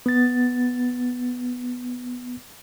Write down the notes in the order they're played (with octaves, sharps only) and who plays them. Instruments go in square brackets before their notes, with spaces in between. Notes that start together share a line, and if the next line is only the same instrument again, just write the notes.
[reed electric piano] B3 A6